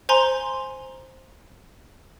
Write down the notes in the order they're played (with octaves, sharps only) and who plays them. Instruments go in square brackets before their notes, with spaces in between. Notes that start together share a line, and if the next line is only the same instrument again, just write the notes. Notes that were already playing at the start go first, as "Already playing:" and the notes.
[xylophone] C5 G#5 A#5 C6